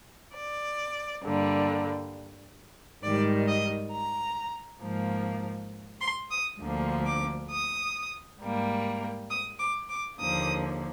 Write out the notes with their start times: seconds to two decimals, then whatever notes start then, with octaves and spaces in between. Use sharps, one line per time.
0.35 D5
1.24 G2 D3 G3 A#3
3.03 G#2 D#3 G3 D5
3.48 D#5
3.93 A#5
4.82 G#2 F3 A#3
6.01 C6
6.31 D#6
6.61 D2 D3 F3 A#3
7.06 D6
7.51 D#6
8.41 G#2 G3 A#3
9.30 D#6
9.59 D6
9.89 D6
10.19 D#2 D3 F3 A#3 D#6